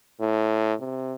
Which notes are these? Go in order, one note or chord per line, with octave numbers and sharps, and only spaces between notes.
A2
C3